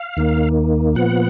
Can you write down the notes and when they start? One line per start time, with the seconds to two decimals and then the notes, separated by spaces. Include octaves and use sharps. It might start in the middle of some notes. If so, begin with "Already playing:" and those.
Already playing: F5
0.17 D#2 D#3 A#3
0.95 A#2 F3 B3 F#5